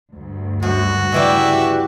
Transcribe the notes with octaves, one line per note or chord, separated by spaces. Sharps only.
D2 G2
F#2 F#4
C#3 E3 G3 D5 E5